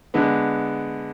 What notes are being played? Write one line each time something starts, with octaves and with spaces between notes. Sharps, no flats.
D3 G#3 B3